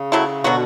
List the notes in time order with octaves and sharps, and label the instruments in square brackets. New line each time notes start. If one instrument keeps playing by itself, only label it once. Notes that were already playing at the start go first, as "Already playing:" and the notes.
Already playing: [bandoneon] C#3
[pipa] F#3 A3 E4
[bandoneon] B2 D3 [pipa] F#3 B3 F#4